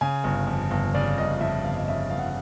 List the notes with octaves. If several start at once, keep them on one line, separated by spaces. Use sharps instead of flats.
C#3 G#5
G1
F2
G1
C#3 D5
G1 D#5
F2 E5
G1 F5
D#5
C#3 E5
G1 F5
F#5